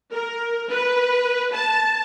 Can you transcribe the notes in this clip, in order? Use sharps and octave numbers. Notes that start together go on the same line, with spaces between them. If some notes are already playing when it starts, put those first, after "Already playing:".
A#4
B4
A5